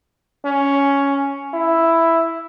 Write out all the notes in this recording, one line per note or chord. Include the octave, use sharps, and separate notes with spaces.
C#4
E4